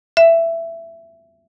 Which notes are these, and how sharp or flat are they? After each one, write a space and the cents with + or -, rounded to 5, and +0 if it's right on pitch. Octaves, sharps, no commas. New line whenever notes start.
E5 +15